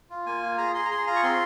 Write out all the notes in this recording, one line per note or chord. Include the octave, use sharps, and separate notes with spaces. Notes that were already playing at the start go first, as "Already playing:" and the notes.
F4
A#3 G#5
F4
G#4 A#5
G#4 C6
A#5
G#4 C6
F4 A#5
C#6
C4 C6